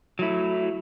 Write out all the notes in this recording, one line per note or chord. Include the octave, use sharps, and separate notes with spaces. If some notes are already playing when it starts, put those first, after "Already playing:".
F#3 A3 E4